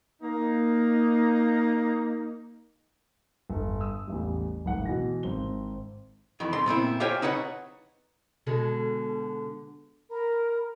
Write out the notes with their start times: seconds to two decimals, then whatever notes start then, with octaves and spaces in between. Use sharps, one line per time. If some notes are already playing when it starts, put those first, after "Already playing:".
0.22 A#3 D#4
3.50 G1
3.81 D#6 E6
4.07 A1 E2 G3
4.65 D1 G#1 F#5
4.85 B2 E3 A#6
5.23 G#1 C4 G7
6.40 F2 D#3 E3
6.53 C2 D#4 C6
6.66 A#2 B3 C4 E4
7.00 G4 C5 C#5 F5 G5 G#5
7.22 D#4 B4 C#5 F#5
8.47 B2 D3 G#3
10.10 A#4 A#5 B5